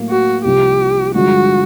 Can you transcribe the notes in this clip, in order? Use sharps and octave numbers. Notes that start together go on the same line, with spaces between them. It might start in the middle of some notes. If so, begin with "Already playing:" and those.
Already playing: A2 F#3 A#3
F#4
C2 C3 F3 G4
G2 D3 F3 G#3 F#4